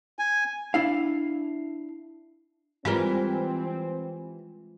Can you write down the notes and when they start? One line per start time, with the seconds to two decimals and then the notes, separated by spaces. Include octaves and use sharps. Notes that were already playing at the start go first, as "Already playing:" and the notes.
0.19 G#5
0.74 D4 E4 F5
2.85 E3 G3 G#3 C4 F4 A#4